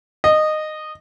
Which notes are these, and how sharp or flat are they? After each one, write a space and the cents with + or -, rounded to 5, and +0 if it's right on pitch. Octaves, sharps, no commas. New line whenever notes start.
D#5 -15